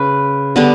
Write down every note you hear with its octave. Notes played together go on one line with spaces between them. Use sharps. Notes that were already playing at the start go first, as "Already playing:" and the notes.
Already playing: C#3 B4
D3 G3 B3 D4